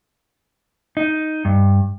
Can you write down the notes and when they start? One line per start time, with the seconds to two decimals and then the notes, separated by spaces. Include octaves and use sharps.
0.97 D#4
1.45 G2